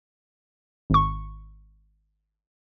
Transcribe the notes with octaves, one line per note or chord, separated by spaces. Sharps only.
G#1 C#6